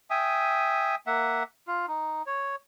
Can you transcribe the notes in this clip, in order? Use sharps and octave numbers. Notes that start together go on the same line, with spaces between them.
E5 G5 G#5 D#6
A#3 E5 F#5
F4
D#4
C#5